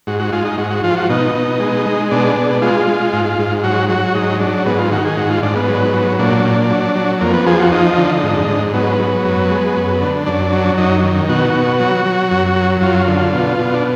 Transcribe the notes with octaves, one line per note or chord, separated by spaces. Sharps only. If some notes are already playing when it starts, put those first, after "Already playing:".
G#2 F#4
F#4
G#3 F4
D#4
G#2 F#4
F#4
F3 F4
F#4
B2 D#4
B2
G#3
G#3
B2 D4
B2
G#3 F4
G#3
G#2
G#2
F#3 F#4
F#3 F#4
G#2 D#4
F#3 D4
G#2 B3
F4
D#3 F#4
G#4
G#2 F#4
F4
G#2 D4
B3
F#3
F#3
A#2 D4
A#2
F#3
F#3
F2 A#3
B3
F3 G#4
F#4
F2 D#4
D3
G#2
G#2
F#3 B3
F#3
F#2
G#3
F#2
D3
F#2 D4
F#3
F#2 D#4
D#3
B2 F#4
B2
F#3
F#3
F#2
F#3
F#2 F4
D3
B2
B2
D4